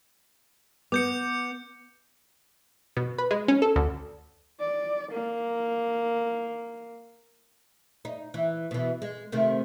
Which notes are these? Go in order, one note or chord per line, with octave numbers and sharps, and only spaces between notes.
B3 D6 G6 C#7
B2
B4
G#3
C#4
A4
D2
D5
A#3
D#4
E3
B2 E3
G#3
C3 D#3 A3